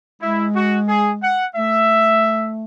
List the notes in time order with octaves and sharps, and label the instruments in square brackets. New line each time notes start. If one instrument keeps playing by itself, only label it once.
[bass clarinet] G#3 [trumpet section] E4
[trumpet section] F#4
G#4
F#5
[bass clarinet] A3 [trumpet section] E5